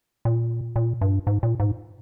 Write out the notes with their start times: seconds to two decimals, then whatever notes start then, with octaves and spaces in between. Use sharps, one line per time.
0.25 A#2
0.76 A#2
1.01 G2
1.27 G#2
1.43 A#2
1.60 G#2